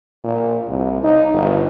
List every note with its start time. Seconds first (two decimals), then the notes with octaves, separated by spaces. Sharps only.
0.24 A#2
0.67 C2
1.03 D#4
1.34 G1